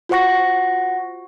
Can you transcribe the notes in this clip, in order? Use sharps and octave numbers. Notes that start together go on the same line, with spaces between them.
F4 F#4 C5 F#5 C#6 A#6